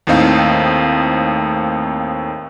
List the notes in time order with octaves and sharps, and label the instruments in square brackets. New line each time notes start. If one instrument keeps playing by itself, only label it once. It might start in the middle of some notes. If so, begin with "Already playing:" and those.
[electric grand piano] D#2 A2 C4 D#4 F5